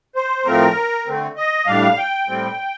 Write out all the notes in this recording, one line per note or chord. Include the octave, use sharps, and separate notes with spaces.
C5
A2 F3 A3 C4 A#4
D3 A3 C4
D#5
A2 G3 D4 F5
G5
A2 G3 C4